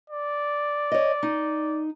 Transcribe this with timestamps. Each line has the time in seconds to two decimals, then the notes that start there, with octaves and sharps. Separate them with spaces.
0.10 D5
0.92 C#5 D#5
1.23 D#4